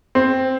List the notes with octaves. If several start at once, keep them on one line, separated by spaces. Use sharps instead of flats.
C4